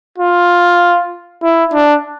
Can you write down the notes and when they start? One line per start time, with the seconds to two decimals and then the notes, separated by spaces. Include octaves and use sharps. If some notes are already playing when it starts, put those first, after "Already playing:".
0.18 F4
1.43 E4
1.73 D4